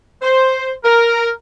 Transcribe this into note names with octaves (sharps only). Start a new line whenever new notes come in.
C5
A#4